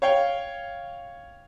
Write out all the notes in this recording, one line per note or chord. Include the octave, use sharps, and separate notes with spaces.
C#5 F5 G5